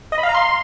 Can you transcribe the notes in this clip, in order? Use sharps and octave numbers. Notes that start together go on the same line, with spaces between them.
D#5
B5
F5
A#5
C6